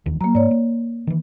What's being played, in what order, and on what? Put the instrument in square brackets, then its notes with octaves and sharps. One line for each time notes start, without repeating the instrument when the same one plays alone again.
[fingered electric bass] E1 D#2 D#3
[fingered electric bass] F#3 [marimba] A#3 A#5
[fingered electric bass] G#2 [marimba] C#5 D5
[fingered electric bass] A#3
D#3 E3